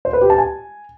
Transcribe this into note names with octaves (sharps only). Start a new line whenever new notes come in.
C5
B4
G4
A5
G#5